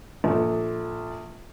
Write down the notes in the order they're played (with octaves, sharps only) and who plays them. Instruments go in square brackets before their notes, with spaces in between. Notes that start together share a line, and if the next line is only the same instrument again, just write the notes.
[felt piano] A#1 A4